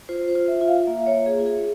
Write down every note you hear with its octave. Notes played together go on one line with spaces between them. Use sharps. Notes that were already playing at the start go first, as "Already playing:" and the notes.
F4 C5
C5
F4
E5
F4
F5
A#3 E5
C#5
A#3
G#4
F4
G#4